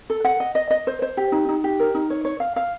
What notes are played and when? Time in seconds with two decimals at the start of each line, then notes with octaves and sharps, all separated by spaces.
0.10 A4
0.25 F#5
0.40 D#5
0.55 D#5
0.71 D#5
0.87 C5
1.02 C5
1.17 G4
1.32 D#4
1.49 D#4
1.64 G4
1.80 A#4
1.94 D#4
2.10 C#5
2.25 C#5
2.40 F5
2.56 F5